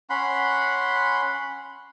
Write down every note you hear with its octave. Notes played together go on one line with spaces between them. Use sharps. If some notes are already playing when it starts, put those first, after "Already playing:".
C#4 F#5 B5 C6